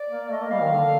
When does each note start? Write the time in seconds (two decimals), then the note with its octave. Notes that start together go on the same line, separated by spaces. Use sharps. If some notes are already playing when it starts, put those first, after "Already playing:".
Already playing: D5
0.10 A#3
0.30 A3 D#5
0.41 A#3
0.51 G3 F5
0.62 D#3
0.73 D3